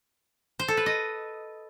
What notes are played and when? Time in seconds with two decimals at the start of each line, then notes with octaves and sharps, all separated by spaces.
0.59 C5
0.68 A4
0.77 B4
0.86 D#5